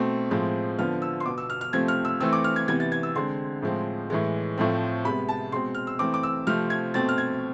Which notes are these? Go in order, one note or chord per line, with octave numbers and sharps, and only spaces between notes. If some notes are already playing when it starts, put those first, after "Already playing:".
Already playing: B2 A3 C4
A2 F3 G#3 C4
D3 F3 B3 F6
E6
C6
B2 B3 D6
E6
F6
F6
C3 F3 A3 C4 G#6
F6
E6
E3 A3 C4 E6
D6
F6
G#6
C3 E3 B3 G#6
A6
G#6
E6
D3 G#3 C4 C6
A2 F3 G#3 C4
A2 E3 G#3
A2 F3 A3 C4
C3 G#3 B3 B5
A5
B2 G#3 C4 C6
F6
E6
E3 A3 C4 D6
D6
E6
C3 F3 A3 C4 F6
G#6
B2 A3 C4 A6
F6
G#6